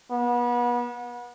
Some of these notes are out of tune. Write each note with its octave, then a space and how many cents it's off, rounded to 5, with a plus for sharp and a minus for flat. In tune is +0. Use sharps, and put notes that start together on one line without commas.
B3 -30